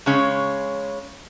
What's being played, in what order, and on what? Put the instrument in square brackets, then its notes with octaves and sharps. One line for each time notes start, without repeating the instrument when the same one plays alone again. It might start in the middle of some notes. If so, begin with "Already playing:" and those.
[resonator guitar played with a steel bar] C#3 G#3 C#4